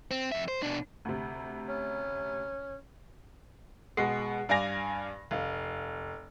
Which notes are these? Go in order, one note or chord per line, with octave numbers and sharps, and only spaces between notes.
C4
F2 E5
C5
B2 D4
D2 C3
C#4
B2 G#3 F#5 C7
G2 D5 F5 G#5 A#6 F7
F1 F5